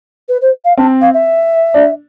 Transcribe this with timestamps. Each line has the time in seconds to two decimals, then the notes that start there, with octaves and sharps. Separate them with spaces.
0.28 B4
0.41 C5
0.64 F5
0.77 C4 A5
1.01 F5
1.13 E5
1.74 D4